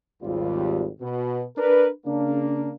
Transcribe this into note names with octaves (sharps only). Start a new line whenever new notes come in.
G#1 D#2 G3 F4
B2
D4 A#4 B4
C#3 A#3 D4